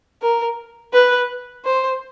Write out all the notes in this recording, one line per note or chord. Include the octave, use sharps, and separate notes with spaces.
A#4
B4
C5